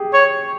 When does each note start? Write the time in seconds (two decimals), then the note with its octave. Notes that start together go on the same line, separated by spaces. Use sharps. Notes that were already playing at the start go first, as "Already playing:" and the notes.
Already playing: G4 G#4
0.13 C#5